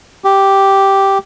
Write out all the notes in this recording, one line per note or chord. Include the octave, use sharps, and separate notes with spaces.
G4